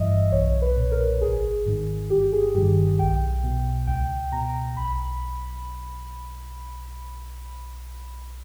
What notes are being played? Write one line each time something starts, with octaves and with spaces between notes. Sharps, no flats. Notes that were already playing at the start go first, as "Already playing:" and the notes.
Already playing: G1 G2 E3 D#5 E5
B1 C#5
B4
A#2
A#4
G#1 G#4
G#2 D#3
G1 G4
G#4
G2 D#3 G4
B1 G5
B2
C#2 G5
B2 A#5
B1 B5